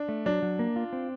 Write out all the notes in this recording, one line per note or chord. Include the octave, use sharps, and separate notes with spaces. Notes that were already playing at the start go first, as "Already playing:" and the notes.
Already playing: D4
A3
F#3 D4
F#3
A#3
F4
C4